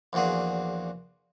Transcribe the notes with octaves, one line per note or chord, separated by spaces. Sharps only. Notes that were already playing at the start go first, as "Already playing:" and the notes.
A#1 E2 A#2 F#4 G#4